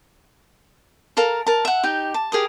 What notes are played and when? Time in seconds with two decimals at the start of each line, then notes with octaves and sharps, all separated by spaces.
1.17 A4 A#4 F5 A#5
1.47 A#4 A5
1.65 E5 F#5
1.83 D#4 G4
2.14 A5
2.32 G4 G#4 A#4 D#6